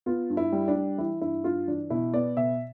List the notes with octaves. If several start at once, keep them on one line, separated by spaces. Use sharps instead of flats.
B3 F4
G2
E4
G3
D4
G3
E3 E4
G2 E4
G2 F4
E3 D4
B2 E4
B3 D5
B2 E5